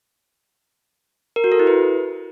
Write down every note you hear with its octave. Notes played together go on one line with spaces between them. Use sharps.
A#4
F#4
A4
E4
B4